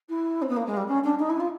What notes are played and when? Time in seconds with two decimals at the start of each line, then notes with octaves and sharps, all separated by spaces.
0.09 E4
0.42 C4
0.49 B3
0.56 A#3
0.66 G#3
0.76 G3
0.87 C#4
1.03 D4
1.19 D#4
1.29 E4
1.39 F4